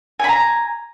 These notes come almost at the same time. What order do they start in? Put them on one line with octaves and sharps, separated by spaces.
G#5 B5 A#5